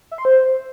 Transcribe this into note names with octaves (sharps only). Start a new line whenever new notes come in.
E5
C6
C5